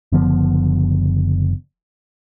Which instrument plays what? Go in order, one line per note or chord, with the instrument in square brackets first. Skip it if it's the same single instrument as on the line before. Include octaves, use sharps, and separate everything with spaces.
[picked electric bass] F#1 D3 F3 B3